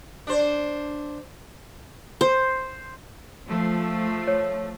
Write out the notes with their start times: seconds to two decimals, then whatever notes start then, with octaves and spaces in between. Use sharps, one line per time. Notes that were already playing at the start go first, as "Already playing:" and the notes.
0.27 D4 C5
2.21 C5
3.48 F3 A3
4.28 C#5